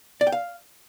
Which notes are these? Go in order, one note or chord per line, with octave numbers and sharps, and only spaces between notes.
D5
G5
F5